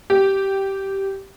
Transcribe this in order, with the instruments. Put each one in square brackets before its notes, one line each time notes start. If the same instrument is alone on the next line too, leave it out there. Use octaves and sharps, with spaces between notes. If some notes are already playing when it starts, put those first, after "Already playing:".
[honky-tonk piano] G4